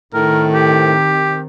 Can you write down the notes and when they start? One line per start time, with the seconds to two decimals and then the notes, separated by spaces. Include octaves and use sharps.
0.14 A2 D#3 C4 A#4
0.54 G4